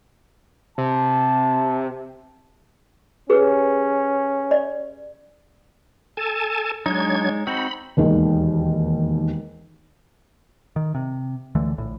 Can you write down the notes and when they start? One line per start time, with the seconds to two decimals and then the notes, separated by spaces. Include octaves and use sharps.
0.78 C3 A5
3.30 C#4 G4 G#4 B4
4.51 D5
6.17 A4 G#5 A5
6.86 F#3 G#3 D4 D#4 G#6
7.47 C4 D#4 F#4 B5
7.97 E1 D#2 D#3
10.76 D#3
10.95 C3
11.55 C#2 D3 E3 A3
11.78 A#1 A2